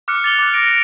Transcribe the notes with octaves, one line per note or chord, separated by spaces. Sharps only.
D6 F6 F#6 C#7
A6 F7 G7
D6 F#6
A#6 D7
D7